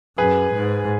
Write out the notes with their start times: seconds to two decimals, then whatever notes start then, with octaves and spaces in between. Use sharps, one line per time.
0.18 F#2 G#4 B4
0.54 G#2